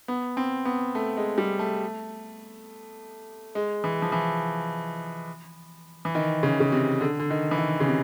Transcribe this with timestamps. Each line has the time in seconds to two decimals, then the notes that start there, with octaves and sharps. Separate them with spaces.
0.08 B3
0.37 C4
0.65 B3
0.95 A3
1.17 G#3
1.38 G3
1.59 A3
3.55 G#3
3.84 E3
4.02 F3
4.12 E3
6.05 E3
6.15 D#3
6.43 C#3
6.60 C#3
6.72 C3
7.00 D3
7.19 D3
7.30 D#3
7.51 E3
7.58 D#3
7.80 C#3
7.88 C3